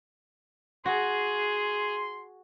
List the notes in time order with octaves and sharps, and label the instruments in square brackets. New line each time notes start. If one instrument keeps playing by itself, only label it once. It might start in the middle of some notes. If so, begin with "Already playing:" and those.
[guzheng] F#4 [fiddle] G#4 [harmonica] C6